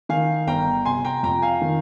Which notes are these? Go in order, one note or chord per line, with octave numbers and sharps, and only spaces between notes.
D#3 F5 G#5
G1 G5 A#5
C3 G#5 C6
G5 A#5
F2 G5 A#5
F5 G#5
D#3